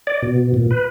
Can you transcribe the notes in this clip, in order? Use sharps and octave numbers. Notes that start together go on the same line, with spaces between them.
D5
B2
A#2
B4